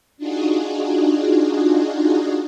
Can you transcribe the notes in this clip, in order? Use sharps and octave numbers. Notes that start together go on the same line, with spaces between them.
D4 D#4 F4 F#4 G#4